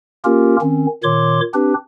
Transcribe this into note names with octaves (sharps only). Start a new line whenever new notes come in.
A#3 C#4 F4 G4 A#4
D#3 C4 C#4
A#2 D#3 C#5 C6 D6
C4 D4 G4 B4